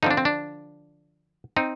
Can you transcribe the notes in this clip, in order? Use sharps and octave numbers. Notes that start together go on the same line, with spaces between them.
D3 F3 C4 D#4
D4
C4
D4
C4 D#4